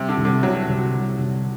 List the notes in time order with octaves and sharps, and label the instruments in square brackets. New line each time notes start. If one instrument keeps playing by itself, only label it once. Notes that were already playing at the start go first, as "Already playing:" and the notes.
Already playing: [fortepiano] C3 [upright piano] G3
[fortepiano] D3
[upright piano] C2
[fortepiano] D3
[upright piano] C3 [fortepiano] F#3
[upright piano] C2
G3
C2